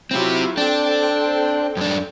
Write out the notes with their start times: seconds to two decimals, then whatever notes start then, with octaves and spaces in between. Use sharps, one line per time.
0.11 F#3 C4 E4 F4 G4
0.57 C4 D4 A4 G5
1.77 F#2 D4